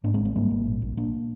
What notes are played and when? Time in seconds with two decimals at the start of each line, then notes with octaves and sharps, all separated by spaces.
0.04 G#2 A#3 D4
0.14 G#3 C4
0.20 G#1
0.25 G#3 C4
0.36 G#2 G3 A#3
0.50 G#1
0.66 A#2
0.82 A#1
0.97 A#2 A#3 D4